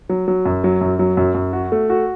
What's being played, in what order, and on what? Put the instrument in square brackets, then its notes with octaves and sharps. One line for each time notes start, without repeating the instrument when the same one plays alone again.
[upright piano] F#3
F#3
F#2
F#3
F#2
F#3
F#2
F#2
F#4
A3
F#4